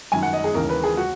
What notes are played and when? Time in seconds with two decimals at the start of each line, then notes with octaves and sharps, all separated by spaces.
0.12 F#2 D#3 G#5
0.23 F#5
0.33 D#5
0.44 G#4
0.54 D#2 C#3 E3 A#4
0.69 B4
0.84 G#4
0.97 F#4